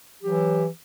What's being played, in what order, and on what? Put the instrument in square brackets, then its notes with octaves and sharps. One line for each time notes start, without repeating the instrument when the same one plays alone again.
[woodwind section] E3 F#3 G4